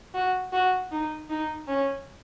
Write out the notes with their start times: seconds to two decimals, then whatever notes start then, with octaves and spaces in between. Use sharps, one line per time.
0.14 F#4
0.52 F#4
0.91 D#4
1.30 D#4
1.68 C#4